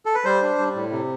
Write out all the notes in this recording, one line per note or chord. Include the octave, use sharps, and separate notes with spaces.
A4
B4
G3 C5
D4
G3
A2
C3